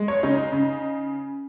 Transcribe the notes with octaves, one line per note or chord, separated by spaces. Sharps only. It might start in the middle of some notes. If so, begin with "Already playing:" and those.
Already playing: G#3
C#5
C#3 D#4
C#3